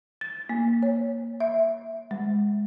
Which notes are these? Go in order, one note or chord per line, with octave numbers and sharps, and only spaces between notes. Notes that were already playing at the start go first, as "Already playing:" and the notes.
A6
A#3
C#5
E5
G#3